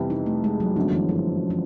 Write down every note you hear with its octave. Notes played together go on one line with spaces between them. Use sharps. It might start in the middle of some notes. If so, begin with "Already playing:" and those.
Already playing: F2 C3 E3 G3 B3
D#4
A3
G#3
F#3
G1 F#2 D3 F3
E3
F3
F3